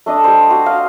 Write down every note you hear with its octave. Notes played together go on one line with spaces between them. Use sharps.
A3 D4 D#5 D#6
G3 C5
F#4 C5
F5 D#6